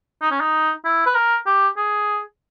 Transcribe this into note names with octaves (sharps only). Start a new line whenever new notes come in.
D#4
C#4
D#4
E4
B4
A#4
G4
G#4